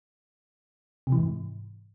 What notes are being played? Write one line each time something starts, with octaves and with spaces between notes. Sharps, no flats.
C3
E3
G#2